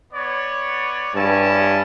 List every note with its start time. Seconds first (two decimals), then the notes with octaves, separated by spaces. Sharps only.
0.13 B3 C#5 D5
1.15 G2 C#4 E4 A5